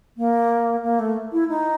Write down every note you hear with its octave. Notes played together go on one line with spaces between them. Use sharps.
A#3
A#3
A3
E4
D#4